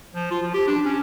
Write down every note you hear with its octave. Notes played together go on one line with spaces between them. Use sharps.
F3
F4
F3
G4
D4
C#4